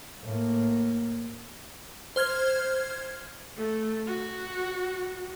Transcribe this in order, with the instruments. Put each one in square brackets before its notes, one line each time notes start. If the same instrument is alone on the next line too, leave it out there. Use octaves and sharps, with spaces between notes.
[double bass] A2 A#3
[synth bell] C5 F6 G#6
[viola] A3
F#4